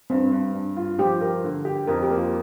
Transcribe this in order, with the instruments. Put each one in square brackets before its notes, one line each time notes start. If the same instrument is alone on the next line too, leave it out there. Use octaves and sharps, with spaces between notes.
[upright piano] G2 [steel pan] C4
[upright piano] G2
G2
F4
[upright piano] F3 [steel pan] G4
[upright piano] A#4
D3
G4
[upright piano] F2 [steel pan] A#4
[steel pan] G4
[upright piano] A#3
[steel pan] F4